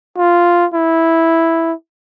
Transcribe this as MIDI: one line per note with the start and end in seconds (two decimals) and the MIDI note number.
0.18 0.66 65
0.74 1.73 64